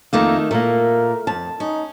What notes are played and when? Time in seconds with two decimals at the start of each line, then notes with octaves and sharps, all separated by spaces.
0.13 F2 D#3 A3 A#3 D#4
0.51 A#2 A3 A#3 A#4
1.27 F2 A5
1.60 C#4 D#4